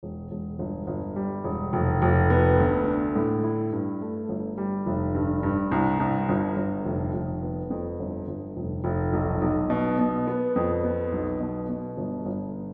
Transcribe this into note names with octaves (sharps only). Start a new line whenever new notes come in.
E1
E1
G1
G1
G3
E1
F1
F1
B3
D2
D4
A2
E4
G2
A3
G1
G3
F1
G2
G2
C2
C2
G1
G1
F1
F1
B3
F2
G1
G1
F1
F1
B1
B1
B2
B2
B3
F2
B3
B1
B2
B2
G1
G1